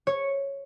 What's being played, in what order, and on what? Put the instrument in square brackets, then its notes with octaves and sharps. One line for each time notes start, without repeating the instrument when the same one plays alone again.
[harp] C#5